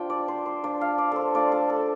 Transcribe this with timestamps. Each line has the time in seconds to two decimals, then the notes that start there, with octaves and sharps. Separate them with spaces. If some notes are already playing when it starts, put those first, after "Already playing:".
Already playing: F3 D4 F4 G5
0.10 D5
0.28 C5
0.46 C5
0.63 F3 D4 F4 D5
0.81 F5
0.98 D5
1.12 A4 C5
1.34 A3 D4 F4 D5
1.52 A4
1.70 A4